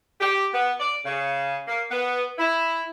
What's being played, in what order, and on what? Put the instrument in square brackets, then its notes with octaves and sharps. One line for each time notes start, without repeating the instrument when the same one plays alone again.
[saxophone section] G4
B3
D5
C#3
A#3
B3
E4